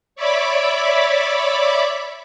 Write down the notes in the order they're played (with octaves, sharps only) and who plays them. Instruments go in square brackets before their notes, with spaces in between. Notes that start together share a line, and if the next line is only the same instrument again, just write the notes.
[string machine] C#5 D5 E5 B5 D6